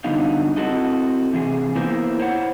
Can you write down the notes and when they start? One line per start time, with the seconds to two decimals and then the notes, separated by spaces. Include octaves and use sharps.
0.04 G2 D3 F#3 B3 D#4 F5
0.56 C4 E4 F#4 A4 D#5
1.33 C3 E3 G#4
1.75 A#3 B3 E4 A#4 C5
2.19 E4 C5 C#5 F#5